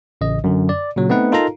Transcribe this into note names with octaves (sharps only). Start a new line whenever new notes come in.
A1 C#3 D#5
F#2 D3
D5
A#2 C#3 F#3
A3 B3 C4 D#4 B4 F#5
D#4 F4 A4 A#4 F5 A#5